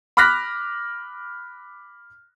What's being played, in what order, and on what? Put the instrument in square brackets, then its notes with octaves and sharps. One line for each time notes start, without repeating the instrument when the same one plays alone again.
[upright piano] B5 D6 F6 F#6 A#6 B6